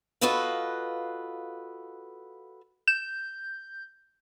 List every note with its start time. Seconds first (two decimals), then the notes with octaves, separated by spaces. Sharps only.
0.21 F4 F#4 A4 B4 D#5 F5
2.88 G6 E7